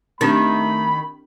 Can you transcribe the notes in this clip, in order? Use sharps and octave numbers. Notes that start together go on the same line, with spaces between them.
D#3 A3 C4 D4 G4 B5